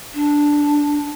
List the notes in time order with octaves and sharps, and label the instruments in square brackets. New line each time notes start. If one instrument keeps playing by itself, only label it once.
[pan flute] D4